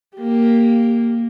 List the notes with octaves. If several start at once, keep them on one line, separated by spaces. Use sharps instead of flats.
A#3 G4